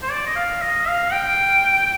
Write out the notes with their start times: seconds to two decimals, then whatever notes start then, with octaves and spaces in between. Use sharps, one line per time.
0.03 C5
0.11 D5
0.26 D#5
0.36 F5
0.61 D#5
0.88 F5
1.13 G5